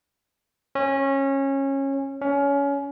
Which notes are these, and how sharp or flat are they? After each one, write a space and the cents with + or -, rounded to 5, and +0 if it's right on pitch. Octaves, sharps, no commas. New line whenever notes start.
C#4 -20
C#4 +25